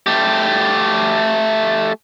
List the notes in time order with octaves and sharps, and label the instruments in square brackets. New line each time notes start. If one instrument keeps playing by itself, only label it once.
[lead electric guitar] A3 G4